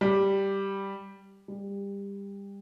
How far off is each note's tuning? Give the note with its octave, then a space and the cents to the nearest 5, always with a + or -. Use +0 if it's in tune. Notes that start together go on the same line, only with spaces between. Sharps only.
G3 +0
G3 +25